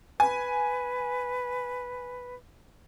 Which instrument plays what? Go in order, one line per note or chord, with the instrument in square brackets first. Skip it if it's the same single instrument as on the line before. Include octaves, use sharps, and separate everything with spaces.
[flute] B4 [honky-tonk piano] G#5